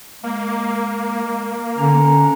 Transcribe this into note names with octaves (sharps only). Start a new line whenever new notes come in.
G#3 A#3
D3 C#4 A#5